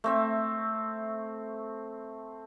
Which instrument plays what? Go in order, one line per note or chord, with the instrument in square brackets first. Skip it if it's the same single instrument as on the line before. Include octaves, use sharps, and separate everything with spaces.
[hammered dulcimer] A3 C4 E5